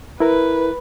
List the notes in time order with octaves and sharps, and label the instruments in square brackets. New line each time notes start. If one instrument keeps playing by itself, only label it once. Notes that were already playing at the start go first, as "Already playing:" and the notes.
[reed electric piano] E4 A#4 [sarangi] B4